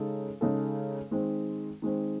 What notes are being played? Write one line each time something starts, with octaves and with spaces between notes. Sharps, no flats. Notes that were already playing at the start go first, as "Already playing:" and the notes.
Already playing: C#3 G#3 D#4 A4
C#3 G#3 D#4 A4
D#3 G#3 C4
D#3 G#3 C4